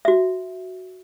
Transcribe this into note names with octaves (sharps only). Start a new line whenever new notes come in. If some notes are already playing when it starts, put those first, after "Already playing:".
F#4 E5